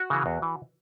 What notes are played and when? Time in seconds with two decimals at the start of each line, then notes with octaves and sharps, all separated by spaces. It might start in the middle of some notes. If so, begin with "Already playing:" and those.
Already playing: F#4
0.10 C#3 E3
0.26 E2
0.42 E3